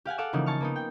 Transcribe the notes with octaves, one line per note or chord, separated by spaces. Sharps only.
G4 F5 F#5 G#5
A4 F5 F#5 D6 E6
C#3 E3 F3 A#3 D#4
G#5 A5 C#6 F6
A#3 B3 D#4
G5